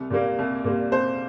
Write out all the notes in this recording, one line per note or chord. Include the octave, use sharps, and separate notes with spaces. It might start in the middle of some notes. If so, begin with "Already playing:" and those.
Already playing: C2
A#2 G3 A#3
C2
A#2 G3 A#3
C2 C5